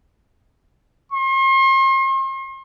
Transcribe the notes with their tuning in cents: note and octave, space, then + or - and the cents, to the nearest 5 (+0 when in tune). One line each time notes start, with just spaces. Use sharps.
C6 +45